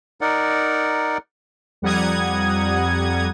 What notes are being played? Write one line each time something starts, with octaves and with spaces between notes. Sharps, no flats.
D#4 A#4 D5 F#5
F2 G3 F#5 A#5 D#6 G#6